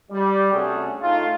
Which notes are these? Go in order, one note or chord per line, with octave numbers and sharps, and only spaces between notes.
G3
C3 A3 C#4 D4 F#4 G#4
A2 A3 D#4 F4